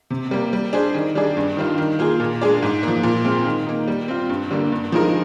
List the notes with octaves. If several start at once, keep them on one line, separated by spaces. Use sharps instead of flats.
C3
G3 A#3
G3
D4 G#4 C5
D#3
G3 D4 G#4 D5
G2
D#3 G3 D4 F4
D#3
A#3 F4 G#4
A#2
G#3 D4 G#4 D5
G#2
F3 A#3
A#2
G#3 C4 F4
D#3
A#3 D#4
G3
C4 F4
G2
D3 G3 A#3
G2
F3 G#3 D#4 A#4